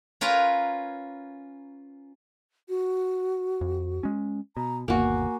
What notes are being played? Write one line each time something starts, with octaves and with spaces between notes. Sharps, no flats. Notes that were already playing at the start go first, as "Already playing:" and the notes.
C#4 F4 A#4 B4 A#5
F#4
F2
G#3 C#4
B2 A#5
G1 D#2 B2 A#3 F#4 G#5